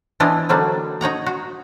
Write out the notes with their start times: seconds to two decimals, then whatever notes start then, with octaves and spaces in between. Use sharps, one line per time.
0.20 E3 B3 D4 E4 F4 D#5
0.49 D3 F#3 G3 A#3 D4 D#4
1.01 D#4 C#5 F#5 A#5
1.26 F#4